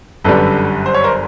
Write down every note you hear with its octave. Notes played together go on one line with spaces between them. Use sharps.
G1 F#2 D3 G3 A4 B4
C5
C#5
A#4 C5